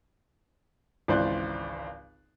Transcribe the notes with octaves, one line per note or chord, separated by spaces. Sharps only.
G#1 C#2 E3 C5 D5 F#6